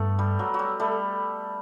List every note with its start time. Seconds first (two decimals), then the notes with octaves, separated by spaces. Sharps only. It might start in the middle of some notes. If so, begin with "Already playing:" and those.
Already playing: G2 A3 B3
0.19 G3
0.39 F#3
0.54 F#3
0.59 G3
0.80 G3 A3